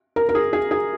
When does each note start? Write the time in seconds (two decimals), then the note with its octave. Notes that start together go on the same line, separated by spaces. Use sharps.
0.16 A#4
0.29 A#4
0.35 G#4
0.53 G#4
0.71 G#4